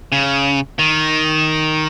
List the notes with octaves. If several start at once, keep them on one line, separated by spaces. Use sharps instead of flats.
C#3
D#3